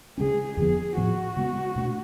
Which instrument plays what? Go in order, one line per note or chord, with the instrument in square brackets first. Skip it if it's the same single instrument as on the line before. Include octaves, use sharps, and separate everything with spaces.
[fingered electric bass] C#3 G#3 C#4 [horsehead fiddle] G#4
[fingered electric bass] F2 D3 F3 B3 [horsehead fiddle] G#4
[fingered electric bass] A2 F3 B3 [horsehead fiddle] F#4
[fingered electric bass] C#3 G#3 B3
B2 A3 D4